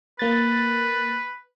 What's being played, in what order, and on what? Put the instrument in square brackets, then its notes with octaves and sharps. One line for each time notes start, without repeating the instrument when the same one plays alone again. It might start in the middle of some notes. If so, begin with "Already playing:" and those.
[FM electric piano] A#3 A6 [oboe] B4